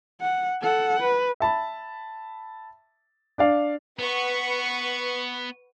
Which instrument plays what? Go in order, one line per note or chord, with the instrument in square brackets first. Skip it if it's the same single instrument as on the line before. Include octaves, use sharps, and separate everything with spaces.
[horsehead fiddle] F#5
A4 F#5
B4
[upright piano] E5 A5 B5
D4 D5 F5
[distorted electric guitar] B3 [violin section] B4 F#5 C#6